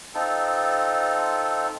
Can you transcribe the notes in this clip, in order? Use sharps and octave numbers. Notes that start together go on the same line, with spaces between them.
C4 D#4 F4 A4